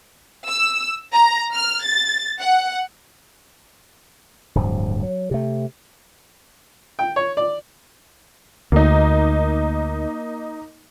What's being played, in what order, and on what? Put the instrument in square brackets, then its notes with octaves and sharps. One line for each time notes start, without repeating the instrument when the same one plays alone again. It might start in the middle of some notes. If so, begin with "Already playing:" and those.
[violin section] E6
A#5
F6
A6
F#5
[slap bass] D1 G2 F3
F#3
C3 A3
[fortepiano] G5
C#5
D5
[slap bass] D2 [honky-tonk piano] A#3 D#4